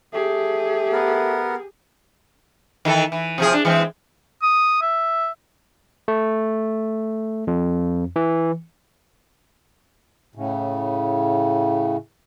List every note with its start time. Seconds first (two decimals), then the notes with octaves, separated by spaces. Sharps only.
0.13 A3 G4 G#4
0.93 B3 A#4
2.85 D#3 E3 A4
3.12 E3
3.38 C3 F3 G#4
3.53 D4
3.65 E3 G#3 C4
4.42 D#6
4.82 E5
6.08 A3
7.47 F2
8.16 E3
10.35 A2 C#3